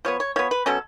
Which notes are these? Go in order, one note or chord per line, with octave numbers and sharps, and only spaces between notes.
F3 B3 C#5
C#5
F3 B3 C#5
B4
B2 F#3 C#4 A4